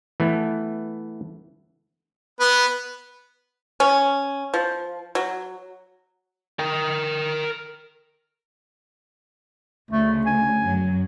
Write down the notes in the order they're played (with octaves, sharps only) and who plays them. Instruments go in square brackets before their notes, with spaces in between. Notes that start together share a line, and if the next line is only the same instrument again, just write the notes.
[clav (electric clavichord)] E3 A3 B3
[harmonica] B3
[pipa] C#4
F3
F#3
[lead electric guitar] A#4 G5
[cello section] D2 C#3 [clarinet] A3
[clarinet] G#5
[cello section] F#2 F#3